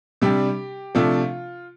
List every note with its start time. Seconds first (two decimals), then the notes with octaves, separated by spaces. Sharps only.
0.22 C3 G3 D4 G4
0.95 C3 F3 A3 D4 F4